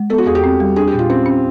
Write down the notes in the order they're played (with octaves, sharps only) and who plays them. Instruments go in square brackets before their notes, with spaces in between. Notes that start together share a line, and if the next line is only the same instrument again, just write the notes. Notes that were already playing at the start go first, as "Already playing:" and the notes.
Already playing: [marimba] G#3
[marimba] B3 [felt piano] A4
[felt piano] F#4
[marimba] E2 [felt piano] G#4
[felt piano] G4
[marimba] C4
G3
[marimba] D4 [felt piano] G#4
[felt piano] G4
[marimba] A#2
[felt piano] F4
[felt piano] C4 [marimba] C#4
[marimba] C#4